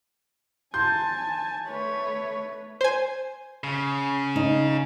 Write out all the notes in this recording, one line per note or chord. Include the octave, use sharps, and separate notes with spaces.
G#5 A5 C6 G6
A3 B4 C#5
C5 G#5
C#3
D#4